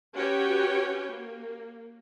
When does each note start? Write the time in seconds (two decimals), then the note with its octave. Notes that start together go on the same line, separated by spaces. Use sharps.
0.16 C#4 F#4 G4 B4 C#5 G5
1.10 A#3